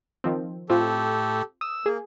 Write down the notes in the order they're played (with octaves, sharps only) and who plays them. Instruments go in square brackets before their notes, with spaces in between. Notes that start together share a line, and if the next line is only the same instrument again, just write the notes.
[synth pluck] D#3 F3 C4
[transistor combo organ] A2 [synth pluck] C4 F4 [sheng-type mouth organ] G4 A4
[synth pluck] D#6 [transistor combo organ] E6
[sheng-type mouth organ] A#3 [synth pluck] G#4